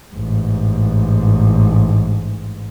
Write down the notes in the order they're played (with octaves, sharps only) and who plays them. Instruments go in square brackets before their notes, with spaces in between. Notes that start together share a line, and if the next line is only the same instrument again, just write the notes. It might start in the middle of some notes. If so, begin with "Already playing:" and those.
[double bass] A1 G#2